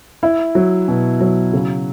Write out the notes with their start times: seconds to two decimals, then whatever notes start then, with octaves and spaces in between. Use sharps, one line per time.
0.23 E4
0.55 F#3
0.88 B2
1.20 F#3
1.53 C#3